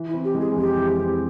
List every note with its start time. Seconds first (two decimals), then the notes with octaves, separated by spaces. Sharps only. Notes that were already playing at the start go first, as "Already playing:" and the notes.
Already playing: E3
0.09 E4
0.14 C4
0.24 G4
0.35 G#3
0.40 G#4
0.56 F2 G4
0.77 E3
0.99 C4